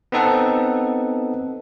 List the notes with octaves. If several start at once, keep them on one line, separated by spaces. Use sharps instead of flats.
B3 C4 D#4 A4 F#5 A5